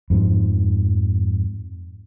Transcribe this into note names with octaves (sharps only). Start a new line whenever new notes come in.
F2 G#2 F3